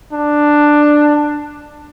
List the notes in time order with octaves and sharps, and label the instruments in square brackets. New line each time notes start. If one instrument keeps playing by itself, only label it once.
[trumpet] D4